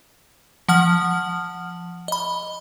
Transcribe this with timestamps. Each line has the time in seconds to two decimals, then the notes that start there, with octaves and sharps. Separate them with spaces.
0.69 F3 F#5 F6 F#7
2.08 D#5 B5